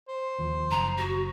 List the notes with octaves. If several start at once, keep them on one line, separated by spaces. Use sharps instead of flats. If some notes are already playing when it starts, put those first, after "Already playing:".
C5
D#2 F3
F#1 A#5
F#4